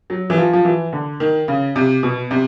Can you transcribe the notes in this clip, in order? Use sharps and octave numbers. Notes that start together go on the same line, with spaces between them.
F#3
E3
F3
F3
E3
D3
D#3
C#3
C3
B2
C3